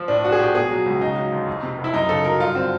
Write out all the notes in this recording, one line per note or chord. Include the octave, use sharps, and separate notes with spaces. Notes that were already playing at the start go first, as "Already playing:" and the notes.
Already playing: F3
A2 D4
F3 F#4
G#4
A#1 G4
B2 G#4
F#3
C#2
C#3 D#4
F#3
D2
F2
C3
F1
E4
F#2 D#4
C#3 A4
F#3 A#4
G2 F4
D3 C4